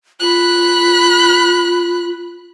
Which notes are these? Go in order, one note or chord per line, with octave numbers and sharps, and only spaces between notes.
F4 B5 F#6